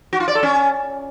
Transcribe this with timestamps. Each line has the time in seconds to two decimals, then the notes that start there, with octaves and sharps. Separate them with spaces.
0.13 F#4
0.20 F4
0.28 D5
0.35 A4
0.43 C#4